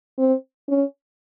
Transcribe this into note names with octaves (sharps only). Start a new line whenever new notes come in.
C4
C#4